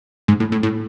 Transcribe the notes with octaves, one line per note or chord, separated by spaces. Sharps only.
G#2
A2
A2
A2